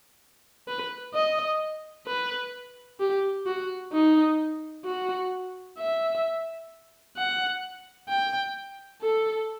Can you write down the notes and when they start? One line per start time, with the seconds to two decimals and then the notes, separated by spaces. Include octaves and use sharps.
0.68 B4
1.15 D#5
2.07 B4
3.00 G4
3.46 F#4
3.93 D#4
4.85 F#4
5.78 E5
7.17 F#5
8.09 G5
9.02 A4